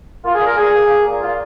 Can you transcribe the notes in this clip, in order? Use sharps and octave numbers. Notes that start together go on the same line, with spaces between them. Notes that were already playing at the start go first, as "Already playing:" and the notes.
A#3 F4
G#4
A#2
A#4
A#2 G#4
A#3
A#3
A#2
A#2 F4